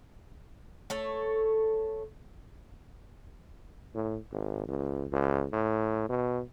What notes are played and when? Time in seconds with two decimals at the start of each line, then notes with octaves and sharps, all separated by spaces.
0.90 A3 A4 C#5
3.95 A2
4.32 G#1
4.68 C#2
5.13 C#2
5.53 A2
6.09 B2